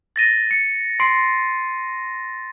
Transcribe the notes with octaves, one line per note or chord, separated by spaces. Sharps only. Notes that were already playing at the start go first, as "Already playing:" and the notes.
A6 A#6 D#7
C#7
C6 C7 D7